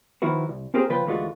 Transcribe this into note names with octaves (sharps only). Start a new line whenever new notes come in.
D#3 F3 E4 F#4 B4
C2
C4 F4 G4 G#4 A#4 C5
C#3 F3 F4 B4 G5
D2 E3 G#3 A3 F4 F#4